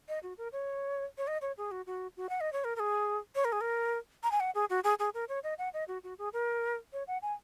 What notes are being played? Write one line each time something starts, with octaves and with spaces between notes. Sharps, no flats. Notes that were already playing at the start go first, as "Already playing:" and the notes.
D#5
F#4
A#4
C#5
C#5
D#5
C#5
G#4
F#4
F#4
F#4
F#5
D#5
C#5
A#4
A#4
G#4
C#5
A#4
G#4
A#4
A#5
G#5
F#5
G#4
F#4
G#4
G#4
A#4
C#5
D#5
F#5
D#5
F#4
F#4
G#4
A#4
C#5
F#5
G#5